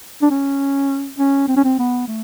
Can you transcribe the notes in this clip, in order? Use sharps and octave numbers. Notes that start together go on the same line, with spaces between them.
D4
C#4
C#4
C4
C#4
C4
B3
A3